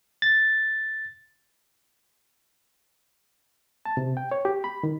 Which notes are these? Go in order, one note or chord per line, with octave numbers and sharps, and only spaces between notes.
A6
A5
C3
G5
C#5
G4
B5
D#3